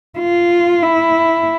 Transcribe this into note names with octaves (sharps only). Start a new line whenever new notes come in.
F4
E4